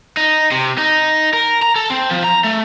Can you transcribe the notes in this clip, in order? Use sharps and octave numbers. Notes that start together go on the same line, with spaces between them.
D#4
C3
D#4
A#4
A#5
A4
C4
F3
A#5
A3